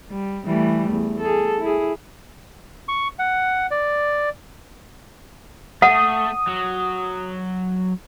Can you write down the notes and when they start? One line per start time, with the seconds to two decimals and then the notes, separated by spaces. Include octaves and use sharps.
0.10 G3
0.45 E3 G3 A3
0.85 E2 A3
1.20 G#4 A4
1.61 E4 G#4
2.88 C#6
3.19 F#5
3.71 D5
5.82 A3 F#5 D#6
6.48 F#3